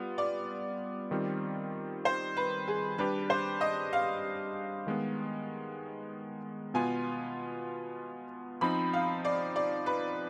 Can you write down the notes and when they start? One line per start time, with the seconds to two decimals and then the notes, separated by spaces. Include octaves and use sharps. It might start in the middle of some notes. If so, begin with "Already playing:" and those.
Already playing: G3 B3 F4
0.18 D5
1.11 D#3 G3 C4 F4
2.05 C5
2.37 B4
2.68 G#4
2.98 G3 D4 G4 B4
3.30 C5
3.61 D#5
3.93 F5
4.87 D#3 G#3 B3
6.74 B2 B3 F4 G#5
8.61 F3 C4 D#4 B5
8.93 F5
9.25 D5
9.56 D5
9.86 B4